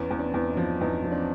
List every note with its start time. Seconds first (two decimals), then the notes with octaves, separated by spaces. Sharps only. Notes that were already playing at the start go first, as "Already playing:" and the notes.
Already playing: E2 B3 C#4
0.11 E2
0.19 C4 D4
0.34 E2
0.49 C#4 D#4
0.57 F3
0.80 E2 C#4 D#4
1.04 F3
1.12 C4 D4